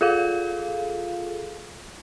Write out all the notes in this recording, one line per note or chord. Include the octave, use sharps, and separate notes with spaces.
F4 G#4 A4 F5